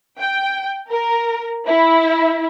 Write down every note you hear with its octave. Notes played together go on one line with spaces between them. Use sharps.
G5
A#4
E4